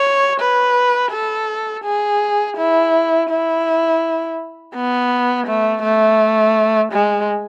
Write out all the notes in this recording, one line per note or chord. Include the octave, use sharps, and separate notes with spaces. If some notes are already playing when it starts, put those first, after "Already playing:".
Already playing: C#5
B4
A4
G#4
E4
E4
B3
A3
A3
G#3